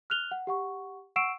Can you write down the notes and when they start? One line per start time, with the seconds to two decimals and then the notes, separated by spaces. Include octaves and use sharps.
0.10 F6 F#6 F7 G7
0.31 F#5
0.47 G4 F#5 C#6
1.16 F#5 C#6 E6 C7 D7 E7